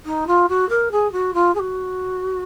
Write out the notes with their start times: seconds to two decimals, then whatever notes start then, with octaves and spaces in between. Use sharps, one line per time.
0.06 D#4
0.27 F4
0.49 F#4
0.69 A#4
0.92 G#4
1.12 F#4
1.34 F4
1.55 G#4
1.59 F#4